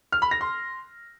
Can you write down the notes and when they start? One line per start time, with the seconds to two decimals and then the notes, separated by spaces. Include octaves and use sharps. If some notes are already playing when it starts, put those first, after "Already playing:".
0.12 F6
0.22 B5
0.31 A#6
0.41 C6